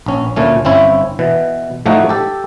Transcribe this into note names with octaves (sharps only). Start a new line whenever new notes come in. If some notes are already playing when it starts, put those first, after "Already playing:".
A#1 C#4
D2 A#2 A3 C#4
G1 C4 C#4 E4
B2 E3
A2 F3 A3 D#4 F#4
G4 A4